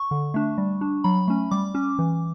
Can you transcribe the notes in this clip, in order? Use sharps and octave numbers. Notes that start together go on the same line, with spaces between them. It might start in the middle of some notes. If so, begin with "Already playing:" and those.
Already playing: C#6
D3
A3 D4
G3
D4
F#3 B5
A3 C#4
G3 D6
C#4
E3